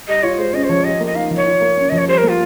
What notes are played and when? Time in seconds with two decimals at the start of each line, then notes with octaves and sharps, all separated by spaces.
0.08 G3 D#5
0.23 F4 C#5
0.38 G#3 C5
0.53 C#4 D#5
0.64 C5
0.69 F3 C#5
0.84 G4 D#5
1.00 A#3
1.06 D#5
1.15 D#4 F5
1.31 F3
1.36 C#5
1.45 F4
1.61 A#3
1.77 C#4
1.89 F3 D#5
1.98 C#5
2.08 G3 C5
2.18 A#4
2.23 A#3
2.28 F4